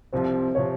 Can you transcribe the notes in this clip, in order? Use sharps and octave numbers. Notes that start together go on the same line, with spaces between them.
C2 C3 F3 C5
C3 F3 C#5